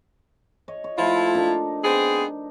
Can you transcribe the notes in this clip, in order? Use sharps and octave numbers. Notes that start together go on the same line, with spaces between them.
C#5 D#5
C#5
F3 A3 E4 F4
D4 D#4 A#4
B3 C4 G#4